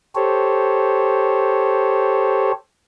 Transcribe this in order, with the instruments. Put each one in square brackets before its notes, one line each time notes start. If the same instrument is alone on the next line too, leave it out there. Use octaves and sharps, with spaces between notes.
[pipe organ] G4 A4 C5 C#5